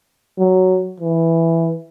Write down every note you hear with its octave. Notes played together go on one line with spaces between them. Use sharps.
F#3
E3